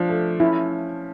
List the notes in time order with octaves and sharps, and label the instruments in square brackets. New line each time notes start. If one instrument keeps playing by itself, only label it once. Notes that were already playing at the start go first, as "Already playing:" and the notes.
Already playing: [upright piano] F3 D4
A3
[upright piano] C#4 [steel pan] E4